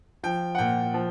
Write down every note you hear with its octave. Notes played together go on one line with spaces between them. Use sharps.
F3 G5
F#5
A#2 G5
F3